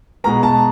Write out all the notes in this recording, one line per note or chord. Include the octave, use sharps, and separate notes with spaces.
B2 G#3 B3 A#5
A5